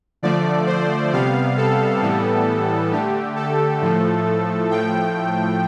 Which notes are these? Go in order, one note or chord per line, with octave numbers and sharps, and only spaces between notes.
D3 F3 A3 D5
C5
C3 G3 B3 F5
A4
A2 E3 G3 B3
D3 A3 G4
A4
A2 F3 A3
A2 F3 A3 G5